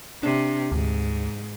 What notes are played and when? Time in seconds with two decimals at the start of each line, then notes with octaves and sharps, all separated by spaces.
0.23 C3 D4
0.72 D2 G#2